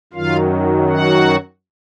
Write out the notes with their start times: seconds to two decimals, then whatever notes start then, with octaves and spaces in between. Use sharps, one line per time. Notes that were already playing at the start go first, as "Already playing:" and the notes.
0.13 F#2 D#3 F#3 F4 F5
0.90 F#4 F#5